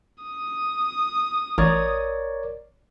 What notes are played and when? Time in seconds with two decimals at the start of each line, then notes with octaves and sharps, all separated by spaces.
0.24 D#6
1.58 A1 A#4 C#5 D5